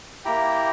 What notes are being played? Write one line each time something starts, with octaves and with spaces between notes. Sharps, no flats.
A#3 E4 G4 G5 A#5